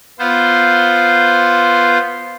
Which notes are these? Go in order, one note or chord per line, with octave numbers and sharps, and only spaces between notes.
B3 F4 C5